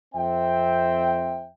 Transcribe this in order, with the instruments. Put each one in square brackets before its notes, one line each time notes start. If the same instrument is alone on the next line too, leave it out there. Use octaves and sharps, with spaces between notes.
[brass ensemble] F2 C4 E5 G5